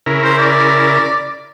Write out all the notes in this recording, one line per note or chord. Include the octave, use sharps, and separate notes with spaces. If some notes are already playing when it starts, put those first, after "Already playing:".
C#3 E4 A#4
C5
D5